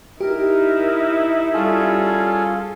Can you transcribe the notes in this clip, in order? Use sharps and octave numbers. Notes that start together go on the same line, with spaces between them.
D#4 E4 G4 A#4
G3 C#4 F4 G#4 A4